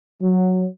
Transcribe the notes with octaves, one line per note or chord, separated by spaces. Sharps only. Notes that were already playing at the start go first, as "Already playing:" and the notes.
F#3